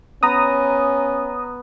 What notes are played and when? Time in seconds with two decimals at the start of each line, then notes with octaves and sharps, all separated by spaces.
0.23 B3 C#4 A#5 D#6